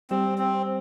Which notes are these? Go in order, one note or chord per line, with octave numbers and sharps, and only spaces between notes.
G3 C4 G4
C4